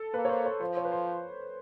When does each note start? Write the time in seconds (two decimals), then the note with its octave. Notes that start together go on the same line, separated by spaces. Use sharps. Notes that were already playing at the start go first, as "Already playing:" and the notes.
Already playing: A4
0.14 A#3 B4
0.25 C#5
0.29 C5
0.45 C#5
0.61 F3 C5
0.77 C#5
0.85 B4
0.92 C5